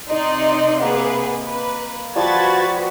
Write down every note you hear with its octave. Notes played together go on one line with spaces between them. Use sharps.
C3 D#4 D5 D#5 C6
A#3 B3 G#4 B4
B4
F3 G3 F#4 B4 B5 G#6 A6